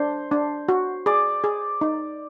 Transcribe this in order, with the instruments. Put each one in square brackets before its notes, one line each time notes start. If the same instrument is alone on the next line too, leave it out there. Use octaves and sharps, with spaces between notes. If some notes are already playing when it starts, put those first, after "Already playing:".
Already playing: [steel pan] D4 [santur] C5
[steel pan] D4
F#4
[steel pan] G#4 [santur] D5
[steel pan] G#4
D#4